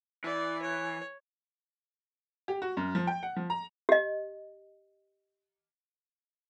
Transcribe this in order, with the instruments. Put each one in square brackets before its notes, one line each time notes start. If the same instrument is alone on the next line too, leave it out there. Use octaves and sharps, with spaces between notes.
[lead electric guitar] E3 [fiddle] D5
[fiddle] C#5
[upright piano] G4
F#4
F#2
F3
G5
F#5
F3
A#5
[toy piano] G4 D#5